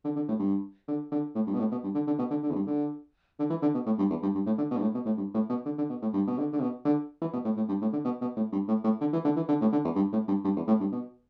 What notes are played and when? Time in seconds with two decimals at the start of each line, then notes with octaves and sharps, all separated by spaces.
0.05 D3
0.16 D3
0.29 A2
0.39 G2
0.88 D3
1.12 D3
1.35 A2
1.47 G2
1.54 B2
1.60 A2
1.72 B2
1.84 G2
1.95 D3
2.07 D3
2.19 B2
2.31 D3
2.43 D3
2.51 E2
2.56 G2
2.67 D3
3.39 D3
3.50 E3
3.62 D3
3.75 B2
3.86 A2
3.99 G2
4.10 E2
4.23 G2
4.35 G2
4.46 A2
4.58 D3
4.71 B2
4.77 G2
4.82 A2
4.95 B2
5.06 A2
5.18 G2
5.34 A2
5.50 B2
5.65 D3
5.79 D3
5.90 B2
6.02 A2
6.13 G2
6.28 B2
6.38 D3
6.53 D3
6.61 B2
6.85 D3
7.22 E3
7.33 B2
7.45 A2
7.57 A2
7.69 G2
7.82 A2
7.93 D3
8.05 B2
8.22 B2
8.37 A2
8.53 G2
8.68 A2
8.84 A2
9.01 D3
9.13 E3
9.25 D3
9.36 E3
9.49 D3
9.61 A2
9.72 D3
9.85 E2
9.96 G2
10.13 A2
10.28 G2
10.45 G2
10.57 E2
10.68 A2
10.80 G2
10.92 B2